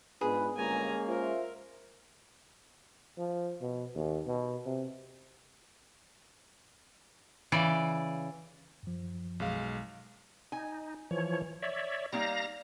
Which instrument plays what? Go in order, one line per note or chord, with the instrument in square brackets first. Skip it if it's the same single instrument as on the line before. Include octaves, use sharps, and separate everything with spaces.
[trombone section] G#2 F4 B4 [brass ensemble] B3 D4 [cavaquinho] G#4
[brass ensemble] G1 [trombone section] G#3 A#3 C#4 [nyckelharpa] G#5 A#5
[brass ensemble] F4 C5 E5 [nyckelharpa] A#4
[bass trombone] F3
B2
D#2
B2
C3
[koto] C#3 E3 D5
[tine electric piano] F#2 F3
[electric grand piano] B1 G#3 F5
[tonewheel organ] D#4 [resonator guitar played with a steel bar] G#5
[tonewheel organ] E3 F3 C#5
C#5 D5 E5
[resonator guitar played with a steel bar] G3 A#3 D#4 [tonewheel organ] F5 A#5 A#6